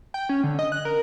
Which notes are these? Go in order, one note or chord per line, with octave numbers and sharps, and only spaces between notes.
G5
C#4
D3
D#5
F#6
A#4